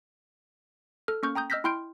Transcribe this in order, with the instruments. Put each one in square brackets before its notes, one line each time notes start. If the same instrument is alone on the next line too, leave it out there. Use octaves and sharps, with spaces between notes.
[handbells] A4 F6
A#3 C#4 C#6 F6 G6
G5 A#5 D#6 G6
D#5 E6 F6 G6 A#6 B6
E4 G5 C6 F6 G6 D7